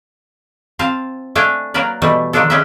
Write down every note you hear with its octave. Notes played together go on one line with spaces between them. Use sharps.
C4 F4 F5 A5
A3 D4 F5 G5 G#5
F#3 A#3 A#4 B4 D5
B2 E3 G3 A3
D3 D#3 F3 D4 A4
G#3 C#4 G4 B4 D#5 E5